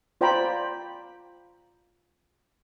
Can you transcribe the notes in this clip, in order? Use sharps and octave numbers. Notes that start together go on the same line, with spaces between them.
F4 C5 D5 G5 A#5 B5